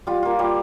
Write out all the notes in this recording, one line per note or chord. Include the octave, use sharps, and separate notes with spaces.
G3 F4
A#3 F4
G3